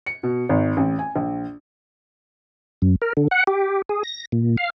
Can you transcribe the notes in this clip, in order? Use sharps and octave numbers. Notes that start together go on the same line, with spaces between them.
C#7
B2
G#1
A1
G#5
A#1
F#2
A#4
D3
F#5
G4
G#4
A#6
A#2
F5